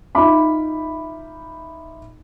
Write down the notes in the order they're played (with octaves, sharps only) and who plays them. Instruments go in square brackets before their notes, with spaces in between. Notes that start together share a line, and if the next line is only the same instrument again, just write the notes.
[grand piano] D#4 F4 E5 B5 D6